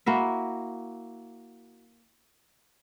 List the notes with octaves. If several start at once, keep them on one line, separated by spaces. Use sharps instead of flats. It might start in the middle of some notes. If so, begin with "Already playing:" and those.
A#3 E4 F#4 E5